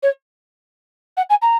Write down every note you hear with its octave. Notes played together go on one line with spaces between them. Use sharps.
C#5
F#5
G#5
A#5